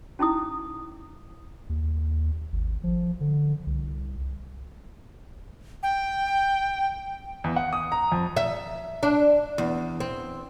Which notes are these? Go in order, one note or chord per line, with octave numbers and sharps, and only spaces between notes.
C#4 D#4 E4 D#6
D#2
G#1
F3
D3
C2
G5
E2
F#5
D#6
A#5
F2
E5
D4
E2
C4